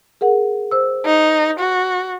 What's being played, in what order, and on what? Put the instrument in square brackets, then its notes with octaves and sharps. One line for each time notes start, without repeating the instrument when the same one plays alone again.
[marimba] G#4 A#4 F#5
C5 E6
[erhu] D#4
F#4